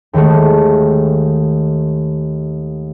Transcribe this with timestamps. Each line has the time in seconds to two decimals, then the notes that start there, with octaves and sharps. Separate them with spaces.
0.13 D#2 D#3 G#3 A3